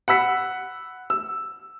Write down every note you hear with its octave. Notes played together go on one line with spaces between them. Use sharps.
F#5 B5 E6 B6 C#7
E6